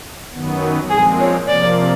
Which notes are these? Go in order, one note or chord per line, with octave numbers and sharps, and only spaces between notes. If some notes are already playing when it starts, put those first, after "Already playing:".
F#2 D#3 F#3 B3
A#2 F3 G#3 C4 G#4
C#5
C3 F3 A#3 D5